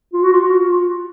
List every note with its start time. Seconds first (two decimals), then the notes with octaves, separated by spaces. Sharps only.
0.13 F4
0.23 F#4
0.33 F4
0.41 F#4
0.50 F4